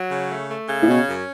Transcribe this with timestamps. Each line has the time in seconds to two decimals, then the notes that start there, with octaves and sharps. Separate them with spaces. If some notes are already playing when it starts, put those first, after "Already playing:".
Already playing: F#3
0.10 C#3
0.30 A3
0.50 A3
0.69 C#3
0.82 A2
0.88 B2 C#4
1.07 F#2